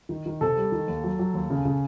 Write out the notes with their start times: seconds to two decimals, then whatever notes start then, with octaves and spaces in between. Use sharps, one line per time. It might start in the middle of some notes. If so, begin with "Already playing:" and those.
0.09 D#3
0.26 D#3
0.41 C3 A4
0.57 G3
0.72 D#3
0.87 D#2
1.04 F#3
1.19 F#3
1.34 D#2
1.50 C#3
1.65 C#3